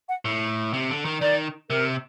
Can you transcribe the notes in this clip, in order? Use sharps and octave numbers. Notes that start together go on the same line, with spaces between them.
F#5
A2
C3
D3
D#3
D#3 D5
C3 A#4